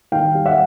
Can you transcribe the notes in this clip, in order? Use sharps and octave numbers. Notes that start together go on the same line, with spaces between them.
D#3 F5 G5
G3
E5 F#5